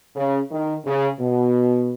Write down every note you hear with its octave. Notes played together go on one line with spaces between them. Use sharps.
C#3
D#3
C#3
B2